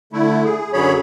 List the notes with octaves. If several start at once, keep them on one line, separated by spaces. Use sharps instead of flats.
D3 A3 E4
G#4
F#2 D3 F#3 G#4 C#5 B5